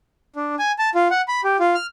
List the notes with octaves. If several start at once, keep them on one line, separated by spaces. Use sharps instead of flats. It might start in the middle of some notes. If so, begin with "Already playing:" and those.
D4
G#5
A5
F4
F#5
B5
G4
F4
F6